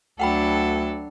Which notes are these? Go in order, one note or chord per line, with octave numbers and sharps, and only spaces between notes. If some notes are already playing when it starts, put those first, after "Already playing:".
D2 F#3 D4 A4 F#5 G5 B5